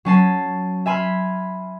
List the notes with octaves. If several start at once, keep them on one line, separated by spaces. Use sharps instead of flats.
F#3 C#4 A5 C7
E5 G#5 B5 C6 F6